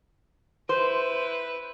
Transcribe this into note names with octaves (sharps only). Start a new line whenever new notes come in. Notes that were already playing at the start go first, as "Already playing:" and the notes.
E4 B4 C5